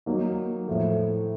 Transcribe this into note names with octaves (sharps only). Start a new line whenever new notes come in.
F#3 A#3 D#4
A2 F3 A3